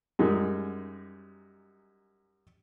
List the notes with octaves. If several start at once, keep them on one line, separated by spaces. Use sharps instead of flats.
F#2 G3 G#3 D#4